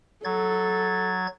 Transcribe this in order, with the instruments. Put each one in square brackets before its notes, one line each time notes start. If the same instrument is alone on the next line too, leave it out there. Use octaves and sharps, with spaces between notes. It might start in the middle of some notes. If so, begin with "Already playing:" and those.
[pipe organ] F#3 G#6 A6 [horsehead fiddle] A4